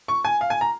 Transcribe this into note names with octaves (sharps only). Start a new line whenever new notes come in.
C#6
G#5
F5
G#5
A#5